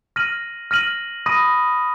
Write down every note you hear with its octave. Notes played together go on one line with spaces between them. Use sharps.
F6 A#6 D#7 F#7
F6 A#6 D#7 F#7
B5 D#6 A#6 D#7